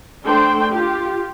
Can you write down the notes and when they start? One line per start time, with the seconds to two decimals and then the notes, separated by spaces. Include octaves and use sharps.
0.25 A3 D4 C5 G5 C6
0.71 F4 G4